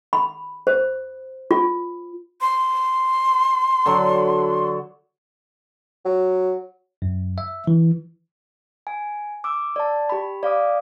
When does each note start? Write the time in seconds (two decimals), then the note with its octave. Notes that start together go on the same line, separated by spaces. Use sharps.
0.13 B5
0.67 C5
1.51 F4
2.41 C6
3.86 D3 F#3
6.05 F#3
7.02 F#2
7.38 E5
7.67 E3
8.87 G#5
9.44 D6 E6
9.76 D5 A5
10.10 G4 B5
10.43 D5 F5 D6 D#6